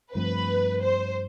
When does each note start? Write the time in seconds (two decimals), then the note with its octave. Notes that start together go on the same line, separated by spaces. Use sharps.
0.14 G2 F3 A3 C4 B4
0.82 C5